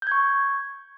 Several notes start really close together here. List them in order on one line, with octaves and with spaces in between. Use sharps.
G6 G#6 C#6